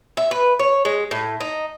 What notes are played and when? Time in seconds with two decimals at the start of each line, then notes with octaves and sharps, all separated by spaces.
0.17 E5
0.31 B4
0.59 C#5
0.85 G#3
1.11 A2
1.40 D#4